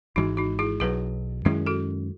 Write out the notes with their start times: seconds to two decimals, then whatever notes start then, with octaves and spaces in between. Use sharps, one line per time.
0.16 G#1 G#2 E3 G#3 D#4 F#4
0.37 D#4 F#4
0.59 E4 G#4
0.80 B1 B2 F#3 G#4 B4
1.45 F#2 D#3 G#3 C#4 E4 G#4
1.67 F#4 A4